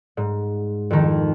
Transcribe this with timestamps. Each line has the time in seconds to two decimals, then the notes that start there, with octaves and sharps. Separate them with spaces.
0.17 G#2
0.90 F2 D#3